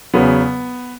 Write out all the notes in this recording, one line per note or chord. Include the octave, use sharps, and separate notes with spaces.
E2 C#3 F#3 B3